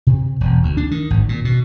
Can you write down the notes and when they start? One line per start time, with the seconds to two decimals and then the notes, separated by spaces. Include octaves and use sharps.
0.07 C3
0.41 E1
0.63 D2
0.77 D4
0.91 D#3
1.10 G#1
1.29 A#2
1.45 B2